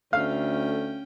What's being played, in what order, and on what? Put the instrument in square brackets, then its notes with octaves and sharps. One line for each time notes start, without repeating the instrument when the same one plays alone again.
[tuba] D2 [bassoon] A3 [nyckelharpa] C#4 G5 [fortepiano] F5